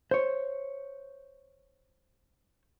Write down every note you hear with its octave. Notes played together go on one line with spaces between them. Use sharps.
C5 C#5